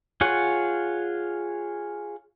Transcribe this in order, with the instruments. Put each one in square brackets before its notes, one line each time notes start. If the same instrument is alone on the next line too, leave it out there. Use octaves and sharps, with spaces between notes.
[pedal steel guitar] F4 G#4 C#5 F#5